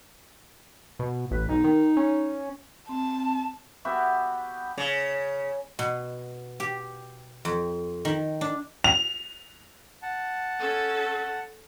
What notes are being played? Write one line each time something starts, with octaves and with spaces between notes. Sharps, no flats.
B2
A1 B4
B1 D#4
D#3
C#4
C4 A5
B3 F#4 G4 E5
C#3
B2
G4
F2
D#3
D4
F7
F#5 A5
C#4 A4